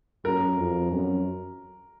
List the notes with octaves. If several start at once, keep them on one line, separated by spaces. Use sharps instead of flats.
F#2 A#4
F2
F#2